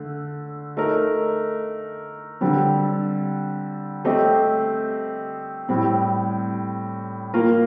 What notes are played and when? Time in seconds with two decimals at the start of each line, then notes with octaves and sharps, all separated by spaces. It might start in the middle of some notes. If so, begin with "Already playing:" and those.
Already playing: D3 A3
0.77 A3 D#4 A#4
2.41 D3 G3 C4
4.05 A3 C4 G4 C5 D#5
5.69 A2 G3 C4
7.34 A#3 F4 A#4